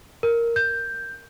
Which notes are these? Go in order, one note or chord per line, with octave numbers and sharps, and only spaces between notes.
A#4
G6